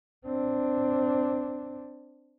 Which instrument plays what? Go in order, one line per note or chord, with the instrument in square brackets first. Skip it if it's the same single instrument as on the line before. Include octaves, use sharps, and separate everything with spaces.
[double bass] C4 D4